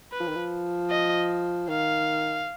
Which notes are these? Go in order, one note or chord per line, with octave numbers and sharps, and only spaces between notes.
B4
F3
D#3
F3
D#5
D#3 F5